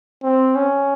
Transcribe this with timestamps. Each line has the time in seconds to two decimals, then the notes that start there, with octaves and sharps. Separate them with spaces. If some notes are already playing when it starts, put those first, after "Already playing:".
0.23 C4
0.55 C#4